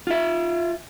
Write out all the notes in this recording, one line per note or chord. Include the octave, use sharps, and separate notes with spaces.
F4 E5